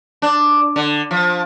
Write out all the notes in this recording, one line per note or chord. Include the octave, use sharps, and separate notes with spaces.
D4
D3
F3